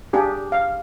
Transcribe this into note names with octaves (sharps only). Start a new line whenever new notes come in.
D4 G4 G#4
F5